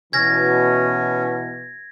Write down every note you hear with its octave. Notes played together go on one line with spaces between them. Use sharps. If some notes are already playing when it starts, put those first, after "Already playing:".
B2 E3 C#4 G#6 A#6